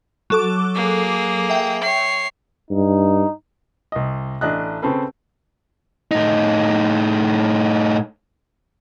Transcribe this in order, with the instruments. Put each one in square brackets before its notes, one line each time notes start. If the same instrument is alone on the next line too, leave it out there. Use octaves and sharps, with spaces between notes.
[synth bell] F#3 A4 D6
[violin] A#3 G#4
[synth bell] E5 G5
[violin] C#5 C7
[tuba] G2 [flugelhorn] D#4
[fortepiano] C2 D#5
A1 D4 D#5 F#6
C#3 C4 A4 B4
[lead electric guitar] A2 D#4